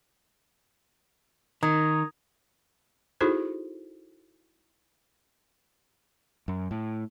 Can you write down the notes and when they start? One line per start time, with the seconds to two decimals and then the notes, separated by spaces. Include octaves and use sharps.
1.63 D#3 A#5 D#6 G#6
3.21 D#4 E4 F#4 G#4 A4 C5
6.48 F#2
6.71 A2